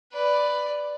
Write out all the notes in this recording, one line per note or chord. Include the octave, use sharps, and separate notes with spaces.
B4 D5